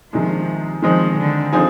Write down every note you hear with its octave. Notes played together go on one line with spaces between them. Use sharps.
C3 D#3 F3 G#3 D4
D#3 F3 G#3 C4 D#4
D3
D3 F3 C4 D#4 G#4